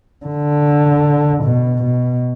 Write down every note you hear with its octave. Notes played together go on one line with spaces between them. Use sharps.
D3
B2
B2